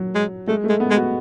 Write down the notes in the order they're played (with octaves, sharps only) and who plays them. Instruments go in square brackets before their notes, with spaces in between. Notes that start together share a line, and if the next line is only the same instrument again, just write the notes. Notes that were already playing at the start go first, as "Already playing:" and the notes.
Already playing: [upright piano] F#3
[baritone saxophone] G#3
[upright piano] G#3 [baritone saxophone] A3
[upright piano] A3
[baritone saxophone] G#3
[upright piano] B3
[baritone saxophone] G#3
[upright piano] F#4